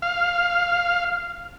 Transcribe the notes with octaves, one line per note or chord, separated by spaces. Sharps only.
F5